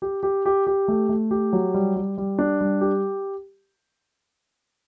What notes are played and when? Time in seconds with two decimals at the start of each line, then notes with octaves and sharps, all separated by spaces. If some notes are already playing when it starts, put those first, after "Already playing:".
0.02 G4
0.23 G4
0.45 G4
0.67 G4
0.88 A3
1.09 A3
1.31 G4
1.53 F#3
1.74 G3
1.96 G3
2.18 G3
2.39 D4
2.61 G3
2.81 G4